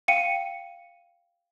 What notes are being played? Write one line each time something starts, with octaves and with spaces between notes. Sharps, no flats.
F5 G5 C#7 D#7